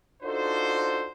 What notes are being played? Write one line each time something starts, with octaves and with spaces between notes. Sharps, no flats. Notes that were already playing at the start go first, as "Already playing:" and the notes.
D4 D#4 F4 F#4 A4 C5